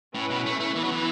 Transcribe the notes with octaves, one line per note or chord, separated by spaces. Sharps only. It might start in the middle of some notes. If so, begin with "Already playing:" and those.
A2 C#4 E4 B4
B2
A3
A3
E3 B3 E4 B4
F#3
E3